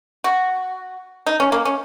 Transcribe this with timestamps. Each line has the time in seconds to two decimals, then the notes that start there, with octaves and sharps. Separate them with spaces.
0.24 F#4
1.26 D#4
1.40 C#4
1.52 A#3
1.65 C#4